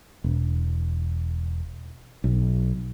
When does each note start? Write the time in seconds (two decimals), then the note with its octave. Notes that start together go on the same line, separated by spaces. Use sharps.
0.24 E1
2.24 B1